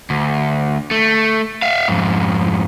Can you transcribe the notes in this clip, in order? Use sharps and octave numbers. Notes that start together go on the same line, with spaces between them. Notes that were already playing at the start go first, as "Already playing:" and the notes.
D2
A3
E5 F5
F2 G#2